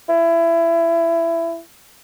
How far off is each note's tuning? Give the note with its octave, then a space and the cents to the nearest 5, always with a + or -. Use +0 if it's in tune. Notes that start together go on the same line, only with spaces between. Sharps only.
E4 +20